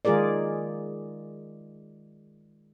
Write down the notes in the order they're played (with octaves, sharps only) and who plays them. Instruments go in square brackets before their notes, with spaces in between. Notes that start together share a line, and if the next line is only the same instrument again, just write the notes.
[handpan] D#3 G#3 F4 G#4 A#4 D5